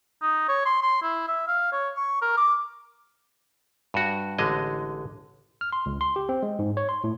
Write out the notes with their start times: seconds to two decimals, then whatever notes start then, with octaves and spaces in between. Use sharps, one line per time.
0.22 D#4
0.49 C#5
0.65 C6
0.82 C6
1.03 E4
1.28 E5
1.48 F5
1.72 C#5
1.97 C#6
2.22 A#4
2.37 D6
3.94 G2 F#4
4.39 A1 D3 G#3 D#5
5.61 F6
5.72 C6
5.86 C#2
6.01 C6
6.16 G4
6.29 C4
6.43 G#3
6.59 G#2
6.77 C#5
6.89 C6
7.04 A2